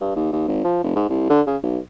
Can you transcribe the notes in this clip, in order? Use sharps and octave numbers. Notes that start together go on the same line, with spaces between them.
G2
D#2
D#2
G#1
F3
F1
G#2
C2
D3
C#3
B1